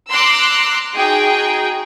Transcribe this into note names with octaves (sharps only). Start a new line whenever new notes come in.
A#5 C6 D6 E6 F#6
D#4 F#4 G#4 G5